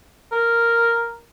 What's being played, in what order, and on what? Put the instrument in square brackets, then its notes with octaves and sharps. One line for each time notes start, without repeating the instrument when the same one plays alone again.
[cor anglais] A#4